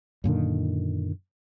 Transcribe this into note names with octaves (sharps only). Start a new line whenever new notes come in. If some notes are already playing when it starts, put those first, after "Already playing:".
F#2 A#2 D3 D#3